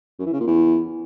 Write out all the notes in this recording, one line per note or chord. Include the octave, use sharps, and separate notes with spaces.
F#2
E3
C#3
A#2
E2